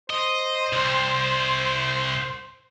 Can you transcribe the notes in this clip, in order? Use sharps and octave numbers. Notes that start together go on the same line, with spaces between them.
C5 D#5
C2